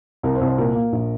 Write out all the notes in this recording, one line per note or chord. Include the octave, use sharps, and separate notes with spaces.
C2 A#4
C5
C2
C5
A#2 A#4
A#3
A#1